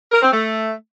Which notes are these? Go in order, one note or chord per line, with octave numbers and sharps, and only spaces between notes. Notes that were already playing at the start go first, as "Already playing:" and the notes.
A#4
C4
A3